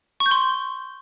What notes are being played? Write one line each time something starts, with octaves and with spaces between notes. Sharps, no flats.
C#6
G6
C6